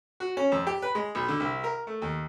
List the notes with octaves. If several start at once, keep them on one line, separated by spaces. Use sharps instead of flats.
F#4
C#4
F2
G4
B4
G#3
B1
D3
C2
A#4
A3
D#2